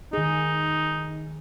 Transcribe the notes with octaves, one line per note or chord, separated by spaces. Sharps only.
D#3 D#4 G#4